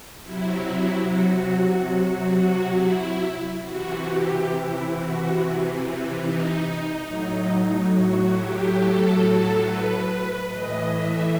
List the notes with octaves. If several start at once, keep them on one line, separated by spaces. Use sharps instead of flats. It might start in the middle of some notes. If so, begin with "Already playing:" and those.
C3 F#3 E4
F#4
F#4
E4
C3 E3 F#4
G4
E4
F#4
D#4
A2 F#3
F#4
G4
A4
A4
B4
B4
A2 E3 D#5
E5